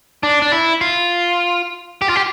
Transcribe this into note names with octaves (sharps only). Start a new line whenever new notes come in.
D4
D4
E4
F4
G4
F4
G4